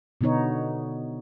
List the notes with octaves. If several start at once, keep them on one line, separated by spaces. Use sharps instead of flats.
B2 D3 B3 D#4 C#5